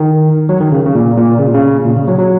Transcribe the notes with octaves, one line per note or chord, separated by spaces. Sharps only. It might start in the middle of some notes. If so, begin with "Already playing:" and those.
Already playing: D#3
F#3
D#3
C#3
C#3
A#2
A#2
C#3
A#2
C#3
A#2
C#3
F#3
F#3